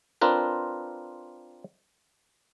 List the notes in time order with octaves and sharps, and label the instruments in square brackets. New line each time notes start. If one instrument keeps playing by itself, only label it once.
[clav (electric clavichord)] C4 D4 F4 A#4 B4